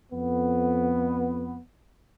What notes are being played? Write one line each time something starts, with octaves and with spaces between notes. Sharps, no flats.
F2 B3